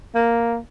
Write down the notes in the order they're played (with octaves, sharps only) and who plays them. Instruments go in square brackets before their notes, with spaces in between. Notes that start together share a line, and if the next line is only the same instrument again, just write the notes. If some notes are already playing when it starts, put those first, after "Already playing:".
[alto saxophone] A#3